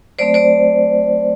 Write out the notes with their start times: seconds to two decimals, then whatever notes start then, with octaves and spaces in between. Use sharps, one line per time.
0.19 F#3 A3 C4 C5 D5
0.34 C5 D5